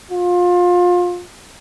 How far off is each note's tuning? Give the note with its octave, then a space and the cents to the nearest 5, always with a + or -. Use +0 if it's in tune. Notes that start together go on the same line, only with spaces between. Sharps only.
F4 +25